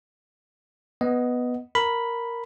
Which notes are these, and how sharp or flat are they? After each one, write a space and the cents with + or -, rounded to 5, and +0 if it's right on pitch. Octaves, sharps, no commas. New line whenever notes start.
B3 +0 D#5 +5
A#4 +0 B5 +0